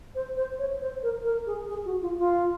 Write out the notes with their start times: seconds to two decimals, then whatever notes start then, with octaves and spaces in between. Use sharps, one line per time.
0.15 C5
0.37 C5
0.59 C#5
0.81 C5
1.03 A#4
1.24 A#4
1.46 G#4
1.69 G#4
1.85 F#4
2.02 F4
2.18 F4